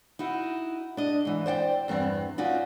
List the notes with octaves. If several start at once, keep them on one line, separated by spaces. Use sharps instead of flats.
D#4 E4 F#4
D4 D#5
G#2 E3
C5 D5 F#5 G5
E2 G2 B3 C4
C#4 D#4 F4 F#4 D5